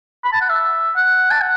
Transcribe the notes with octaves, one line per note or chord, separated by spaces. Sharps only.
B5
A5
F#5
E5
F#5
A5
F#5